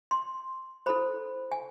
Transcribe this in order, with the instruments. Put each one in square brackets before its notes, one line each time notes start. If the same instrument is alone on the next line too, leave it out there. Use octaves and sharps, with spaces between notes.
[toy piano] C6
E4 A4 C5 B5
G#5